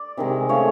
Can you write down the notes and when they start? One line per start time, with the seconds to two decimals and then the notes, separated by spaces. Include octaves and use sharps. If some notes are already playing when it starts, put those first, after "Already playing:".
Already playing: D5
0.17 C3 D#3 G#3
0.49 C#3 F3 A3 C#5